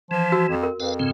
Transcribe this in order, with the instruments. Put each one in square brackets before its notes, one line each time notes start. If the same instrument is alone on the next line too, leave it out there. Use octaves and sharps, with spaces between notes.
[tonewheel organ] E3 [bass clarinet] F3
[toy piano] F#4 E6
[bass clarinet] F2
[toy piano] A#4
[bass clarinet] F2 [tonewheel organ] B4 F5
[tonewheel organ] G#2 C#3 C4